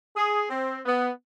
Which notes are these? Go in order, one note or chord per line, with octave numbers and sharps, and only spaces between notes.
G#4
C4
B3